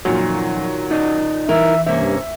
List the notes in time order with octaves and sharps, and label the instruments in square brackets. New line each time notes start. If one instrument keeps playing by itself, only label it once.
[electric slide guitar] F#2 F3 [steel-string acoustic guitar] A#2 D#3 [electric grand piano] F#3
[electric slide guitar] D#4 D5 D#5
[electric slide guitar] E3 [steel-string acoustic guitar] D#4 E4 A#4 [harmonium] E5
[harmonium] G2 [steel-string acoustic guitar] C3 A#3 C#4 [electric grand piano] E5